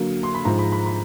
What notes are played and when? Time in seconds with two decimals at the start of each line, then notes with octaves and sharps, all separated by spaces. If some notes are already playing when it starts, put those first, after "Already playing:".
Already playing: D3 F#3 A#3
0.23 C6
0.35 B5
0.45 G#2 F3 G#3 A#5
0.59 B5
0.72 B5
0.86 B5